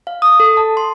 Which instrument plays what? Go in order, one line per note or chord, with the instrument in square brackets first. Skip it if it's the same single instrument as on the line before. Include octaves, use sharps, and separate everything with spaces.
[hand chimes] F5
D#6
A4
A5
C6